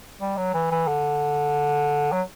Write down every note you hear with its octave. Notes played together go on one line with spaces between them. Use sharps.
G3
F#3
E3
E3
D3
F#3